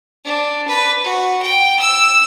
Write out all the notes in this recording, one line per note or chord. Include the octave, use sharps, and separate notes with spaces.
D4
B4
F#4
G5
E6